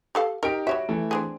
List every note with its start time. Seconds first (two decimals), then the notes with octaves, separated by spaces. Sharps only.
0.15 G4 A4 F5
0.43 D#4 G4 A#4 D7
0.67 G3 F#4 C#5 E5
0.89 E3 A3
1.11 C4 D4 G#4